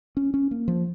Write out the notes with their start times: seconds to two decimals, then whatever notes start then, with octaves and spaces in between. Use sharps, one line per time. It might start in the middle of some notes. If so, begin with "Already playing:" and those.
0.17 C#4
0.34 C#4
0.51 A#3
0.68 F3